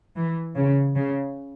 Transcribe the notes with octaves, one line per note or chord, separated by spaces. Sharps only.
E3
C#3
C#3